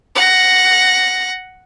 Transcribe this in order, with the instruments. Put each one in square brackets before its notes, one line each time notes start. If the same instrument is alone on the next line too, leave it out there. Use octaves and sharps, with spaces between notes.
[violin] F#5 A#6